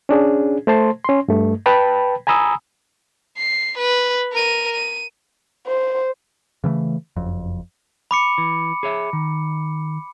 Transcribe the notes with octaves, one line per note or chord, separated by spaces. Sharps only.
C#4 D4 G#4
A3 C5 A5 C6
C#4 C6
G2 A3
B4 G5 A5 B5
G#5 A#5 B5 D#6 E6
C7
B4
A#4 D#7
D#7
C5
C#3 E3 G3 A3
F#1 F2
B5 D6 C#7
E3
G#4 C#5 E5
D#3